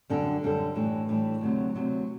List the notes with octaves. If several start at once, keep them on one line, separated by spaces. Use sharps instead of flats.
F#2 D3 G3 D4 A4
F#2 D3 G3 D4 A4
A2 E3 G3 D4
A2 E3 G3 D4
D2 C3 F#3
D2 C3 F#3